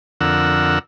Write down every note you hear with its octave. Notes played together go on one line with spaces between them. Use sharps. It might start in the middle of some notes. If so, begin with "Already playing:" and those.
F2 D3 A#4 F#5 E6